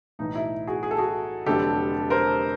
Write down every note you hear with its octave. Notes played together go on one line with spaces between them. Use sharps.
B1 A2 E3 D#4
E4
F#4 G#4
G#4
A4
F#4 G#4
F1 F2 D3 F#3 G4 A4
A#4 C5